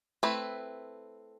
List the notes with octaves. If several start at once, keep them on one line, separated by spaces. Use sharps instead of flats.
A3 C4 E4 B4